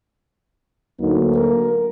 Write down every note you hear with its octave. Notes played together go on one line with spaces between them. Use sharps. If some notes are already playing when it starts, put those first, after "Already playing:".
D2 D3 F#3 A#3 D#4
A#4